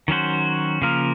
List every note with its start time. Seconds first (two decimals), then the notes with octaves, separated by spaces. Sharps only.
0.08 D#3 F#3 C#4 F#4 C5
0.82 C#3 F3 A#3 F4 A#4